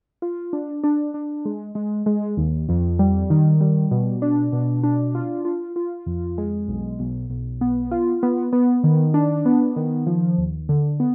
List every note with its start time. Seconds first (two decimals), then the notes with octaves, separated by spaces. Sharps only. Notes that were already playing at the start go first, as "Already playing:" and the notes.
0.22 F4
0.53 D4
0.84 D4
1.14 D4
1.45 G#3
1.75 G#3
2.06 G#3
2.37 D#2
2.69 F2
2.99 G3
3.30 D#3
3.61 G3
3.91 B2
4.22 D4
4.53 B2
4.84 D4
5.15 F4
5.45 F4
5.76 F4
6.06 F2
6.38 G#3
6.68 B1
6.99 B1
7.30 B1
7.61 B3
7.91 F4
8.23 B3
8.53 B3
8.84 D#3
9.14 D4
9.45 B3
9.76 D#3
10.07 F3
10.38 D#2
10.69 D3
11.00 B3